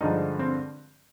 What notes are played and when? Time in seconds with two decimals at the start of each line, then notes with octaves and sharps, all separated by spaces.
0.01 G2 D3 F3 G#3 D#4
0.39 C4